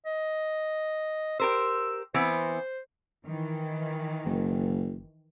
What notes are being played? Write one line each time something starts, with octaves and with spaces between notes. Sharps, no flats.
D#5
G4 A#4 C5 E6
E3 B3 C4 C5
D#3 E3
F#1